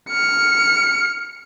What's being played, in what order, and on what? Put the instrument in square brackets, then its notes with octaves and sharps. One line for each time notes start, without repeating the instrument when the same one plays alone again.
[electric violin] F6 C#7